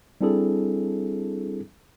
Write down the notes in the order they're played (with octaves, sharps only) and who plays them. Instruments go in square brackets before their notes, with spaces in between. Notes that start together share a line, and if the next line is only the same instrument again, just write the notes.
[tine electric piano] G3 C4 D4 E4 G#4 A4